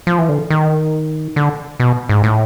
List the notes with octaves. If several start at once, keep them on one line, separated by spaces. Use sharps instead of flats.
F3
E3
D3
D#3
D3
B2
G#2
A2